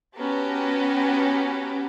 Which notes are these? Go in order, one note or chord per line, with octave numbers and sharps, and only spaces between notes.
B3 C#4 F#4 G4 A5 A#5